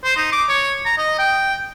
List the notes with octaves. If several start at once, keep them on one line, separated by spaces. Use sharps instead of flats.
C5
D#4
D6
C#5
A#5
D#5
G5